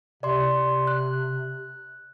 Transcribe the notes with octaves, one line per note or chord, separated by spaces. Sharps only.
C3 D5 C6
F#6